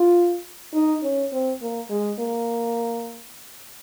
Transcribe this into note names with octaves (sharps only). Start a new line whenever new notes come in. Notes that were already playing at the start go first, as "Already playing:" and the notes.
Already playing: F4
D#4
C#4
C4
A#3
G#3
A#3